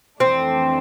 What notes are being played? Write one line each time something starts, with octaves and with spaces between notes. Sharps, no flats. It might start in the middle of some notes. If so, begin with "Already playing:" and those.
F2 E3 A3 C4 D4